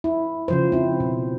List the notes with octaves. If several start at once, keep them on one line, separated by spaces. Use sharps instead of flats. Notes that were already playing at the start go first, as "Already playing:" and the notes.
E4
C#3 F3 C5
C4 E4
B2